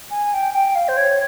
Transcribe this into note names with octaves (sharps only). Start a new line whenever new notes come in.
G#5
G5
G5
F5
C5
C#5